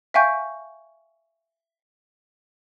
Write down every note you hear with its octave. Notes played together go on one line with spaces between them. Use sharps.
E5 F5 G5 G#5 C#6 G6